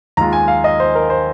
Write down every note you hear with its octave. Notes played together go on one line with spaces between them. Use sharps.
D#2 D#3 G#3 F4 A#5
G#5
F5
D#5
C5
A#4
C5